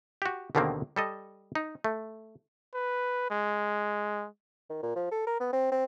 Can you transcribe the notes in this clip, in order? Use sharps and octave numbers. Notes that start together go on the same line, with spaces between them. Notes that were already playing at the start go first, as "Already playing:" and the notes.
F#4 G4
D#2 B2 D3 D#3 A#3 C4
G3 A4 D#5
D#4
A3
B4
G#3
D#3
A#2
F3
A4
A#4
B3
C4
C4